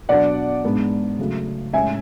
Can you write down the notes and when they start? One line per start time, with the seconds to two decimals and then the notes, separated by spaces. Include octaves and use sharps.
0.09 B2 F#3 B3 D4 D5 F#5
0.64 G#2 G#3 B3 D4
1.19 C#3 F#3 A3
1.73 A2 G#3 C#4 E5 G#5